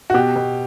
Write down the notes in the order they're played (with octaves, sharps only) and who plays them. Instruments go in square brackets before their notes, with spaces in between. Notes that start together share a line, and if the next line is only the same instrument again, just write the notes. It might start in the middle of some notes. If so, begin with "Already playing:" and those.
[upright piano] F#4
B2 G4
B2